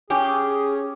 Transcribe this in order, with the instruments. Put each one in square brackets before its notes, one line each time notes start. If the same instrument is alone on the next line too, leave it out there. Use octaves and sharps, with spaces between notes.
[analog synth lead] C#4 [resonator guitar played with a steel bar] G4 [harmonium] G#4